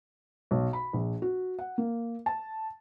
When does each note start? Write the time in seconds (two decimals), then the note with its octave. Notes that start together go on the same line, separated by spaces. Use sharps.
0.51 B1
0.73 B5
0.93 A#1
1.22 F#4
1.59 F#5
1.78 A#3
2.26 A5